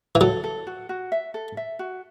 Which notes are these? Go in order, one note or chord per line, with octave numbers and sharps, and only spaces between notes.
E3
F#3 A4
A4
F#4
F#4
E5
A4
E5
F#4